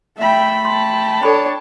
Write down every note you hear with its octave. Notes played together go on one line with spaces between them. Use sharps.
A3 E5 G5 B5
G5 A5 C6
D4 A4 C#5 B5